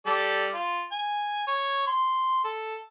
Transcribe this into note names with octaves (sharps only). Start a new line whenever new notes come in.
G3 A4 D5
F4
G#5
C#5
C6
A4